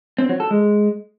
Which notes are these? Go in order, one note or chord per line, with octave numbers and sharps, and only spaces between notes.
C4
F#3
A4
G#3